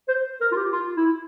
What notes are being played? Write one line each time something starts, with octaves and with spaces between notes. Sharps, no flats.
C5
A#4
F4
G4
F4
E4